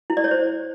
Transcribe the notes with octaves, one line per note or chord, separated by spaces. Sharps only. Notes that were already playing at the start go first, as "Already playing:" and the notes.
E4
D5
C#5
C5